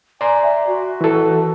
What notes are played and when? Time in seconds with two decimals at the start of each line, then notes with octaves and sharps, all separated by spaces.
0.21 D5 G#5 A#5 C6
0.42 E5
0.67 F#4
1.01 E3 A4